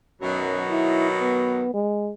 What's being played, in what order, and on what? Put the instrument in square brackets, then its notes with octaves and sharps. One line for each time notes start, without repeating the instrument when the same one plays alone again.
[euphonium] F#2 [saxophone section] B2 D#3 F#3
[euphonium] E4
B3
G#3